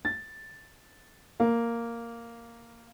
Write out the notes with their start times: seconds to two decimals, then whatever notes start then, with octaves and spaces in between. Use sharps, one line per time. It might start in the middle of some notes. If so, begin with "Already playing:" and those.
0.05 A6
1.40 A#3